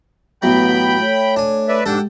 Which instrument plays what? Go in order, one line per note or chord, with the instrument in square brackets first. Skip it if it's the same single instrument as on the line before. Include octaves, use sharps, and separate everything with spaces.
[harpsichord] A1 F#3 [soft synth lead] B3 [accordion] G5 B5 G6
[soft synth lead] A3 [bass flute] C#5
[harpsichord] D4 G#5
[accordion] B4 D5 E5
[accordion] G#2 D4 [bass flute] G#3 [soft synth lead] G4 [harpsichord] A4 F#5 G5